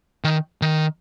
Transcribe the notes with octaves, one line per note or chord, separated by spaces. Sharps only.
D#3
D#3